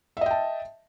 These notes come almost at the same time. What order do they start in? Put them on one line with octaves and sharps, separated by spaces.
E5 D#5 G5 A5